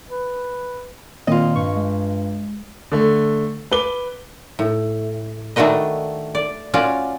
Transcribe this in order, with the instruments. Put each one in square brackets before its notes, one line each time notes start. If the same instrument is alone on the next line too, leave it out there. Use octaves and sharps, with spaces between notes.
[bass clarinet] B4
[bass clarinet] A#2 [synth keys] D#3 A#3 C4 [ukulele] F4 D#5
[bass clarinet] G2 [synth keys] C#6
[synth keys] G#3
[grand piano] D3 A3
B4 D6 G7
[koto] A2
D#3 A3 D4 F#4 B4 D#5
D5
C#4 F4 F#4 D5